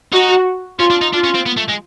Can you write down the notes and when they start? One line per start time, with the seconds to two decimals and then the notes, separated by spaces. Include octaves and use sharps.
0.13 D#4 F#4
0.79 C#4 F4
0.90 D4
1.01 D#4
1.13 D4 F4
1.24 C#4
1.35 C4
1.46 B3
1.57 A3
1.68 G#3